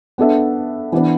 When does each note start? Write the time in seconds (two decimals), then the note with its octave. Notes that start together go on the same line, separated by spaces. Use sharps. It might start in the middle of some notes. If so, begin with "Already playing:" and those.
0.18 B3 D4 A4 E5
0.92 E3 B3 D4 B4